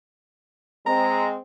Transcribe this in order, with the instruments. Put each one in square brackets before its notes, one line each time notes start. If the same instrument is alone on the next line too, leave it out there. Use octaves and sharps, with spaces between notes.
[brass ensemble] G#3 C4 [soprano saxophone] A#5